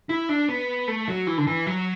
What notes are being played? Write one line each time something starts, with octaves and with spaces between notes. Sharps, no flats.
E4
D4
B3
A3
F#3
E3
D3
E3
F#3